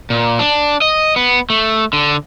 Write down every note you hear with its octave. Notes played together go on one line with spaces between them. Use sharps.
A#2
D4
D#5
B3
A3
D3